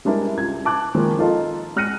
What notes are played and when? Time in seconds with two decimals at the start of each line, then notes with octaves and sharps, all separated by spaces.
0.05 G3 G#3 D4 E4 A#4
0.37 C#2 F4 G#6
0.65 A5 D6 F#6
0.95 D#3 F3 G#3 A#3
1.19 D#4 F4 A4 D#5
1.76 G#3 F6 F#6 A#6 C#7 D#7